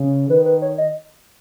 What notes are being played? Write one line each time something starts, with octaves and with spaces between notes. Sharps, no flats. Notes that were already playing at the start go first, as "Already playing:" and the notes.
Already playing: C#3
D#3 B4
B4
C#5
D#5